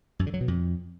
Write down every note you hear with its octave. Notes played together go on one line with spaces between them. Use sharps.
F#2
D3
F#3
B2
F2